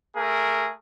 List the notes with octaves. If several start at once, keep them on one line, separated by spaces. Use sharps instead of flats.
A3 G#4 A#4